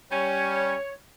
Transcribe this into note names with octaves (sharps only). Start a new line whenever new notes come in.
G3 C#4 C#5